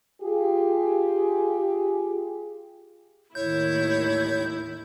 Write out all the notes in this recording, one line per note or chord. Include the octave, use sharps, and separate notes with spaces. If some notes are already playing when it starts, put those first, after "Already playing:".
F4 G4 G#4
D#2 A2 D#3 E4 C#5 G6